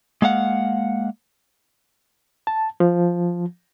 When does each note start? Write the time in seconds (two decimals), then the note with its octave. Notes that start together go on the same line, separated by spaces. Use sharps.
0.22 G#3 A#3 F5 F#5
2.47 A5
2.80 F3